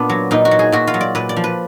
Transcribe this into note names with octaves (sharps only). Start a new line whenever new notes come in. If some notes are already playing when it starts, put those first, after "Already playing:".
Already playing: A#2 B3 D4
F#3
A#2 D#4
F#4
F#3
G#4
A#2 F#4
F4
F#3
D5
A#2 B4
D5
F3
B4